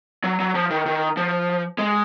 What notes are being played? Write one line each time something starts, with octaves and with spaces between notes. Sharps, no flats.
F#3
F#3
F3
D#3
D#3
F3
G#3